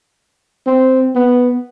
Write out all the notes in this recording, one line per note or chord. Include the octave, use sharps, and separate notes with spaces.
C4
B3